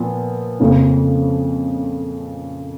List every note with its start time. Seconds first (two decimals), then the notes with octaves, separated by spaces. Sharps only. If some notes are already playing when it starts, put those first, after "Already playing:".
Already playing: A#2 F3 B3
0.60 F2 C#3 F3 A#3 C#4